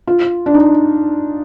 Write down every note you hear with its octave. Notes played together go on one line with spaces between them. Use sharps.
F4
D4
D#4